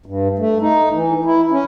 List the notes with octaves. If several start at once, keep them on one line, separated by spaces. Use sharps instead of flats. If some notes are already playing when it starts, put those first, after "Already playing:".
G2
A3
D#4
E3
E4
C#4